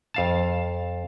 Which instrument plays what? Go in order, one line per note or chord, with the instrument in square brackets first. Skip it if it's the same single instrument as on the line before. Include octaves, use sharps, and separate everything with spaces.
[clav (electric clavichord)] F2 F5 A5